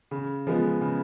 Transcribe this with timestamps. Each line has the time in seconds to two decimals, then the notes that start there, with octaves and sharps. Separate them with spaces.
0.11 C#3
0.47 F3 G#3 B3
0.81 C#3